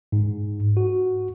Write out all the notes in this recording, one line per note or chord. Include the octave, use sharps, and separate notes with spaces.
G#2
F#4